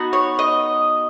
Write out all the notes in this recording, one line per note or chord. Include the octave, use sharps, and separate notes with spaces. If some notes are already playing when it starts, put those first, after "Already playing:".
Already playing: B3 D#4 F#4
C#5
D#5